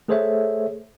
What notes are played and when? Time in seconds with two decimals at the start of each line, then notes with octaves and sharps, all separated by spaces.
0.08 A3 G#4 A4 C5 C#5 E5